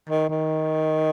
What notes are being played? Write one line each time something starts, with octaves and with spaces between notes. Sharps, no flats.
D#3
D#3